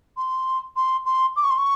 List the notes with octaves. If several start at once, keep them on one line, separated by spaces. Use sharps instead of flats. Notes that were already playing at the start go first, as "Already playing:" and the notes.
C6
C6
C6
D6
C#6
C6
C#6